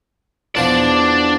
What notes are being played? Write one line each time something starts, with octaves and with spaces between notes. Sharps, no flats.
E2 F3 B3 D4 D5